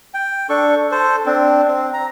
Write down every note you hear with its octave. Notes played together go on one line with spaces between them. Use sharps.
G5
D4 A4 C#6
A4 C5
C4 D4
C4
A#5